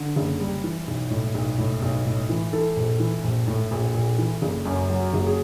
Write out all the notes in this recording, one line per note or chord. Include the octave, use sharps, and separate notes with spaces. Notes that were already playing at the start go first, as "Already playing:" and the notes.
Already playing: D3
F#1
G3
E3
B1
A2
B1
A2
B1
A2
E3
E3 A4
A#1
E3
A#1
A2
A#1
A#1
E3
F#1
F#2
F#3
F#1
G#4